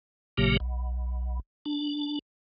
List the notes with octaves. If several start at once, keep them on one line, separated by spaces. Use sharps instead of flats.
A1 A#2 C#3 F#3 A#3 G4
B1
D4